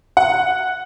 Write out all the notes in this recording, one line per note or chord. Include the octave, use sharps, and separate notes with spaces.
F#5